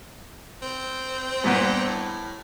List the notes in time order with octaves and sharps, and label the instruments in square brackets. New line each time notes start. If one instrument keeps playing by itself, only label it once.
[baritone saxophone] C4
[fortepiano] G2 A#2 B3
[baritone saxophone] A2